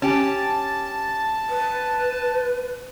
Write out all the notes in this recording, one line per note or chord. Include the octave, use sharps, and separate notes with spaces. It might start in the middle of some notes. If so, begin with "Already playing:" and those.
C#4 G4 A5
B4